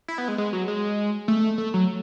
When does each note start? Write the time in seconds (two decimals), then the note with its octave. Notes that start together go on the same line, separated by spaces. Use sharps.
0.08 E4
0.18 B3
0.28 G#3
0.38 G#3
0.53 F#3
0.68 G#3
1.28 A3
1.58 A3
1.74 F#3